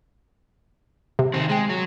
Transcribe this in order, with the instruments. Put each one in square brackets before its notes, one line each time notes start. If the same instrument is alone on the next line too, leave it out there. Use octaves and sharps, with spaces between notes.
[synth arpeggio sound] C3
[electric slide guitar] D#3 C4
[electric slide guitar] G#3 [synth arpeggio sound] G5 G#5
[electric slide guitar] F#3